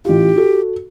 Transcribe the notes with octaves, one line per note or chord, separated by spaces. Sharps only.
A1 F4 G4
F#4 A4